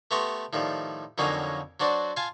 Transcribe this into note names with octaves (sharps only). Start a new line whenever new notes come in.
A3 B3 G4 A#5 C6 C#6
A2 D#3 F3 G3
F2 D3 F#3 A#3 C#4 D#4
F#3 D4 F#4 C5 D5
F4 F5 G#5 A5